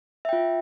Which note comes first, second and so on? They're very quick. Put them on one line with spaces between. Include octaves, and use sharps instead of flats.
E5 G5 F4